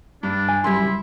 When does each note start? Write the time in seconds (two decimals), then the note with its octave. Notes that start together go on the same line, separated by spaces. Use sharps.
0.23 G2 D4
0.49 G#5
0.64 F#2 G3 E4 C6